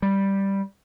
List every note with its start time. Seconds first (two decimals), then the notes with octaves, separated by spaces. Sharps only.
0.02 G3